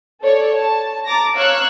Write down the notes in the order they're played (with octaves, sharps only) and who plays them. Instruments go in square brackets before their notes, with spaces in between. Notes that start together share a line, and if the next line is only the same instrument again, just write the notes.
[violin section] A4 C#5 D5
A5
A#5 D6 A6 A#6
C#5 F5 C#6 E6 F#6